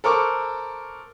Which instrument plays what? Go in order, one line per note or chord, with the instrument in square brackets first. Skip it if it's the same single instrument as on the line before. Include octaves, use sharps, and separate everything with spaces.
[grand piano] A4 A#4 C5 C#6 D6